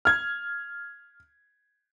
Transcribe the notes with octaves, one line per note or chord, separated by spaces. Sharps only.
F6 G#6